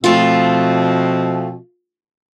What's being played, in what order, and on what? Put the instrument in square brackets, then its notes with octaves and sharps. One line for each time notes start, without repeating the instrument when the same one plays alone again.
[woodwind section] B2 F3 C4 [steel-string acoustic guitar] A3 F4